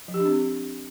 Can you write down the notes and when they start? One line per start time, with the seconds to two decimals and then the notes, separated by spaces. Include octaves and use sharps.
0.08 F3
0.14 G4
0.20 D4
0.26 C4